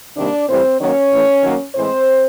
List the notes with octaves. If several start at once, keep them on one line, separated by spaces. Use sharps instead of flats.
C3 D#3 G3 A#3 D4 D5
A2 E3 G3 C4 C5
D#3 F#3 A#3 C#4 C#5
A2 E3 A3
D#3 F#3 A#3
A2 E3 G#3 C4 C5